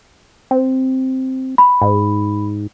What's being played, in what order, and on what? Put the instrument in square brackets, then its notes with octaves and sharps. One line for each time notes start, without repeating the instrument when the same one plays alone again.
[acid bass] C4
[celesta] B5
[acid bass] G#2